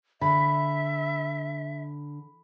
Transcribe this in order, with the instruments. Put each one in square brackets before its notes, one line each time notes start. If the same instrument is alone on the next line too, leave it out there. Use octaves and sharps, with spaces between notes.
[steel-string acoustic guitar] D3 [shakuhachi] E5 [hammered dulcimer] B5